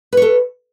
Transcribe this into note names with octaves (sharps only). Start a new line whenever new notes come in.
A4 B4 C#5